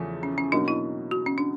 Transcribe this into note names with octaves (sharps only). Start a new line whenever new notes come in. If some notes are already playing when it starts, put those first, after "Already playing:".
Already playing: E2 C#3 F3 A3
C#4
C#4
B2 F#3 A#3 D4 D#4
E4
F#4
C#4
D4